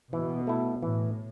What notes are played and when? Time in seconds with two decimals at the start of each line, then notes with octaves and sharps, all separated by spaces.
0.13 B2 E3
0.47 A3 E4
0.82 A2 E3